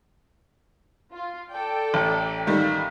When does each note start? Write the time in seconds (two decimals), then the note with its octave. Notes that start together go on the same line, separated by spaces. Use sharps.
1.15 F4
1.51 A4 D5 G5
1.94 A1
2.47 D#3 G3 F5